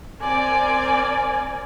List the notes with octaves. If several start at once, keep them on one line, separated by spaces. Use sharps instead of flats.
C4 A#4 D5 G#5